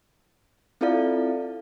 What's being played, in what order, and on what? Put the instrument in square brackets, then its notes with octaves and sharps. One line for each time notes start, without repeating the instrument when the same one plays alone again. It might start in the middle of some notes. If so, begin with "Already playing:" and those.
[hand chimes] C4 E4 F4 A4 D5 F5